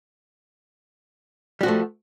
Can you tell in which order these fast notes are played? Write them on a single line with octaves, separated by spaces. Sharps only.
G3 F#4 F3 A3